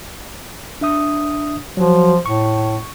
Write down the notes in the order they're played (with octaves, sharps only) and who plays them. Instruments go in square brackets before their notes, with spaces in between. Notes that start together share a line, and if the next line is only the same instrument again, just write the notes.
[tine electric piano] D4 E5 D#6
[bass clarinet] F3 [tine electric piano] F#3 F#4
[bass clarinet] A2 [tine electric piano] C#6